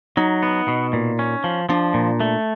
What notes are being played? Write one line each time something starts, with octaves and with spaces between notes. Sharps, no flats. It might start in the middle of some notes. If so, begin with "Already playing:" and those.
F#3 D#4
B3
B2
A#2
C#4
F3
F3 D4
A#2
A3